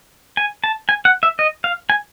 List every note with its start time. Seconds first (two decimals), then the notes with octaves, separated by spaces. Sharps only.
0.37 G#5
0.64 A5
0.89 G#5
1.05 F#5
1.23 E5
1.39 D#5
1.64 F5
1.90 G#5